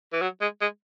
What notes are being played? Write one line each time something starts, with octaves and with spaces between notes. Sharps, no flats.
E3
F#3
G#3
G#3